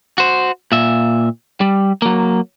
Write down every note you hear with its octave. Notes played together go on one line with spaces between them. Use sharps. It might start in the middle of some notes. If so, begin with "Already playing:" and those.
F#4 C5
A#2 E5
G3
F#3 A#3